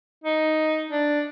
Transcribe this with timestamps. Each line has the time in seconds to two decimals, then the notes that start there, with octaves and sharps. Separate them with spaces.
0.24 D#4
0.90 D4